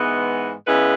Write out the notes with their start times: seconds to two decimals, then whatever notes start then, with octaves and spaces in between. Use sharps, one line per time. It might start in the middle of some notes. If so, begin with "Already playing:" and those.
Already playing: G#2 E3 G#3 B3
0.67 C#3 G#3 B3 E4 B4